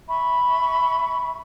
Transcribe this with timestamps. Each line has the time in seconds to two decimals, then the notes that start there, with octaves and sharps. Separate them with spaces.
0.08 E5 B5 C#6